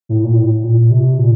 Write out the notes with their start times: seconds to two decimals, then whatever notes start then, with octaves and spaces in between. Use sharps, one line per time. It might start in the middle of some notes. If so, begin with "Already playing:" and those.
0.09 A2
0.24 A#2
0.36 A2
0.64 A#2
0.91 C3
1.18 A#2